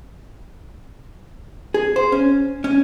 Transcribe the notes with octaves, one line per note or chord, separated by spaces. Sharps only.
G#4
C5
C#4
C#4